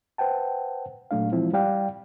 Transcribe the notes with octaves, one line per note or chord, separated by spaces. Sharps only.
B4 C5 F#5 G5 A5
A#2 F#3 A3 D4 F5
E3 F3 G#3 C4 E4 F4
G3 D5 F5 G5